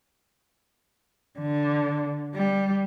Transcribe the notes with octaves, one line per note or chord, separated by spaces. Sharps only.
D3
G3